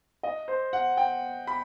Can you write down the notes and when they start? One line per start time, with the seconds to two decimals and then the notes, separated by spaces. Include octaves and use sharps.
0.23 D#5
0.48 C5
0.73 F#5
0.97 G5
1.47 B5